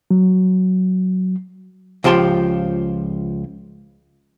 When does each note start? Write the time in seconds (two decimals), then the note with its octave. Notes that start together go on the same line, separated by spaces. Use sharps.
0.11 F#3
2.04 C#2 F3 G4 A5 C6